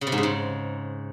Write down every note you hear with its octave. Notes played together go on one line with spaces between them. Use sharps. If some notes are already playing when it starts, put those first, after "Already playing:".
C#3
C3
G#2
C#3
G#2